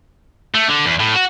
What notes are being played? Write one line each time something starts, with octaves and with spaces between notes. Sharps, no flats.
A3
D3
E2
A2
F#4